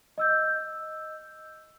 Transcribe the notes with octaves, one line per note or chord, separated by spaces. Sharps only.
D#5 E6 G6